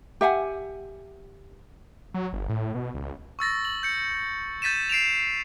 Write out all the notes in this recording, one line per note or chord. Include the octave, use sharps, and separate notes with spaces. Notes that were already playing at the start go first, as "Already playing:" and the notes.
G4 E5 F#5 G#5
F#3
G1
A2
B2
C#2
C#6 E6 A6 A#6
F#7
G6 C#7
G6 A6 B6 D#7 E7
C7 D7 E7 F7